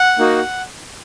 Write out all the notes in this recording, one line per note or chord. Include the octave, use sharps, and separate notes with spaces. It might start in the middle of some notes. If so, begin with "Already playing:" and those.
Already playing: F#5
A#3 D#4 F#4